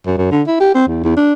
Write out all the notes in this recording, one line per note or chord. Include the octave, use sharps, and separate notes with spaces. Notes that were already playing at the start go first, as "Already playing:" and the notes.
F#2
F#2
D3
E4
G4
C4
E2
E2
D4